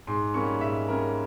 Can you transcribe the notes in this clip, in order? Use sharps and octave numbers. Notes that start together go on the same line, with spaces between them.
G#2 C6
G3 A#3 C#4 C#6
G#2 E5
G3 A#3 C#4 A#4